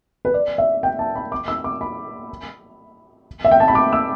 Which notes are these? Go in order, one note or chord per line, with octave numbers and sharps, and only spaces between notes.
B4
D5
E5
G5
A5
B5
D6
E6
D6
B5
E5
G5
A5
B5
D6
E6